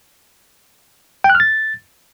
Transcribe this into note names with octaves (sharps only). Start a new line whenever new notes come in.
G5
F#6
F6
A6